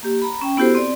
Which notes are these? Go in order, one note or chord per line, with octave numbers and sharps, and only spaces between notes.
A#3 G4
A#5 B5
C#4 G5
B3 E4 F#4 G4 A4 C5
C4 D5